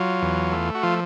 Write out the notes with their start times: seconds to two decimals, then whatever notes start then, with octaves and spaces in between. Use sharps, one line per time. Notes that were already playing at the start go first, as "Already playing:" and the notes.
Already playing: F#3 F4
0.22 E2
0.52 A3
0.75 F#4
0.83 F3 F4